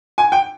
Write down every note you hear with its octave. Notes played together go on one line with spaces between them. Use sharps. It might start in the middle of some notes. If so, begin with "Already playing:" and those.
G#5
G5